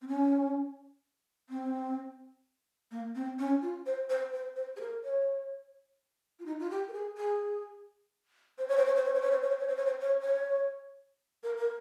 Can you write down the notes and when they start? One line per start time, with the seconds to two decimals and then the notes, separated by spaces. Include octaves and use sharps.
0.02 C4
0.08 C#4
1.49 C4
2.91 A#3
3.15 C4
3.39 C#4
3.62 F4
3.86 C5
4.10 C5
4.33 C5
4.56 C5
4.76 G#4
4.81 A#4
5.04 C#5
6.40 F4
6.46 D#4
6.60 F4
6.70 G4
6.88 A#4
6.93 G#4
7.18 G#4
8.58 C5
8.68 C#5
8.77 C5
8.86 C#5
8.96 C5
9.05 C#5
9.14 C5
9.22 C#5
9.32 C5
9.41 C#5
9.50 C5
9.59 C#5
9.68 C5
9.77 C#5
9.86 C5
10.01 C#5
10.21 C#5
11.43 A#4
11.57 A#4